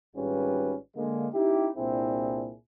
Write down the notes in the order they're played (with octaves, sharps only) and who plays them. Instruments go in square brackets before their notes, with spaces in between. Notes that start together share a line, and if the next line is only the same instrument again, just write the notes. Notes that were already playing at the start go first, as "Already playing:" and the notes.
[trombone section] G#1 G#2 G3 C#4 F4 B4
D3 G#3 A#3
C#4 D#4 E4 G4
C2 A#2 C4 D4 E4 G#4